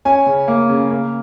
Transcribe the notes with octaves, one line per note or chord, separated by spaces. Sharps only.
C#4 G#5
C#3
A#3
C#3
A#3